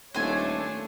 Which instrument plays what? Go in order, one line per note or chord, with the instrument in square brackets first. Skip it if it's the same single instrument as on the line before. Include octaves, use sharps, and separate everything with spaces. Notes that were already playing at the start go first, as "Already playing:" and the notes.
[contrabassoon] D#1 [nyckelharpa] A3 D4 [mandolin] C5 G#5 [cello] C#5